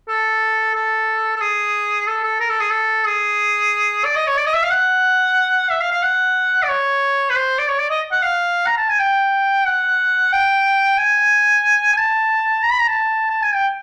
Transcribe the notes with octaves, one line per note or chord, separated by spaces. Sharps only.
A4
A4
A4
G#4
A4
A4
A#4
A4
G#4
A4
G#4
D5
D#5
C#5
D5
D#5
E5
F5
F#5
E5
F5
F5
F#5
D5
C#5
B4
C5
D5
C#5
D5
D#5
F#5
F5
A#5
A5
G#5
G5
F#5
G5
G#5
G#5
A5
A#5
B5
A#5
A5
A5
G#5
G5